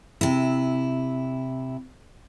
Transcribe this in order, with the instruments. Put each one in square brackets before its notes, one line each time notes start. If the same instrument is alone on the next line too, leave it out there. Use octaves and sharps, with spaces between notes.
[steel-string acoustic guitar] C3 E4